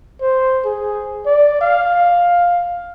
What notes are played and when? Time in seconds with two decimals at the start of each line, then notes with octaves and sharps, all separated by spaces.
0.21 C5
0.65 G#4
1.26 D5
1.61 F5